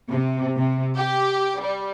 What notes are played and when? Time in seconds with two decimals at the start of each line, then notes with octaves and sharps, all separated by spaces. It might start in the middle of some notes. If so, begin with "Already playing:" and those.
0.11 C3
0.58 C3
0.96 G4
1.60 G3